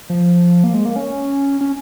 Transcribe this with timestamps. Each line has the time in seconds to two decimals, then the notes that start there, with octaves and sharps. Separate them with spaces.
0.10 F3
0.64 A#3
0.74 G#3
0.85 A#3
0.96 C#4
1.61 C#4